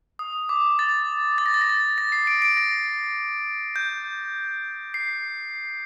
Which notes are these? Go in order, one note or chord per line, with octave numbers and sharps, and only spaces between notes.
D#6
D6
A6
A6
A#6
A6
A#6
A6
A#6
C7
D7
D7
A#6
G6
C7